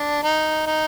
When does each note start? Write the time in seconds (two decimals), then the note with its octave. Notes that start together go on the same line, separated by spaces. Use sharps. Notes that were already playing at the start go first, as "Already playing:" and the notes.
Already playing: D4
0.23 D#4
0.66 D#4